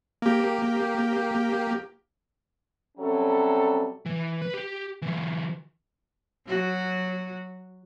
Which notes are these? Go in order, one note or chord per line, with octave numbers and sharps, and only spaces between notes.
A#3 G4
C3 F#3 G3 C#4 A4
E3
B4
G4
E3 F#3
F#3 F#4